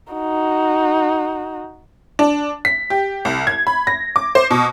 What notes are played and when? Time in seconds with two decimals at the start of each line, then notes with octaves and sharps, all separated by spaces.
0.13 D#4 F#4
2.19 D4
2.65 B6
2.90 G4
3.25 C2
3.47 G#6
3.67 B5
3.87 A#6
4.16 D6
4.35 C5
4.51 B2